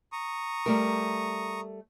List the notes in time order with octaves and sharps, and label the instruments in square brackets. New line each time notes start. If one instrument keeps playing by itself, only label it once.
[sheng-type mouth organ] A#5 C#6 D#6
[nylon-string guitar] G3 A3 A#4